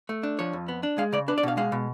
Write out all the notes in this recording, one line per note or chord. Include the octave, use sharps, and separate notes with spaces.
A3
D4
F3 C#5
F2
B3
D4
G#3 F5
C#3 D5
D4 B4
D5
B2 F5
G#3 F5
B2